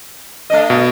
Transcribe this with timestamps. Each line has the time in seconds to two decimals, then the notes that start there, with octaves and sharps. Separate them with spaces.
0.50 A3 D4 D#5
0.70 B2